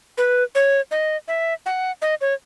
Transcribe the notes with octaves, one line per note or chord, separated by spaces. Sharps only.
B4
C#5
D#5
E5
F#5
D#5
C#5